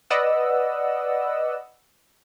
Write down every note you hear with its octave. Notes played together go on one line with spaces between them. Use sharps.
B4 D5 D#5 F#5 E6